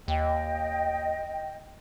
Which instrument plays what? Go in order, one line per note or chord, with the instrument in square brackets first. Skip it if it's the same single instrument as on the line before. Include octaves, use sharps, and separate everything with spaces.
[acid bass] D#2 [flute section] D#5 G5